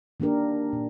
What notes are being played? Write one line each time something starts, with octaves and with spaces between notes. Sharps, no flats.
D#3 A#3 D4 G4 A#4
A#2